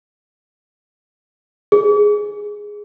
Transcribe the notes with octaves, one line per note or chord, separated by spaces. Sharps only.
G#4